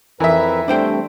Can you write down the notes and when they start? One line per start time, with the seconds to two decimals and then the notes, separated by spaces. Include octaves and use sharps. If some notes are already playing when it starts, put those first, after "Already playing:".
0.20 F2 E3 A#4 B4 E5
0.68 G3 A3 C4 D4 C5 G5